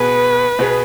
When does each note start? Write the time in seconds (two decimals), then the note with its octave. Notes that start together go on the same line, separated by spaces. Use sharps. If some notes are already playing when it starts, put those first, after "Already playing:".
Already playing: B2 B3 G#4 B4
0.59 B2 B3 G#4